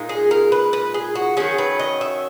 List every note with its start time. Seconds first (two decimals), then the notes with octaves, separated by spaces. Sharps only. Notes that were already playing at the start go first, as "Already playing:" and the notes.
Already playing: A#2 G#3 D#4
0.09 G#4
0.31 A#4
0.52 B4
0.73 B4
0.94 G#4
1.15 F#4
1.37 D#3 F#3 C#4 G#4
1.58 B4
1.79 D#5
2.01 E5